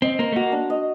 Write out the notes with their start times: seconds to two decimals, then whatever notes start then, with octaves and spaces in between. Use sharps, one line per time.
0.02 C4 D#5
0.19 A#3 C5
0.32 A3
0.36 A#3 F#4
0.52 D4
0.70 D#5